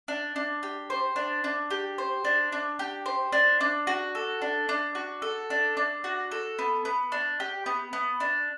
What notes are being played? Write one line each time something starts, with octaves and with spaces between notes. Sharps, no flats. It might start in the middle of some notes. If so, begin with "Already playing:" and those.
D4
D4
G4
C5
D4
D4
G4
C5
D4
D4
G4
C5
D4
D4
F#4
A4
D4
D4
F#4
A4
D4
D4
F#4
A4
B3
B3
D4
G4
B3
B3
D4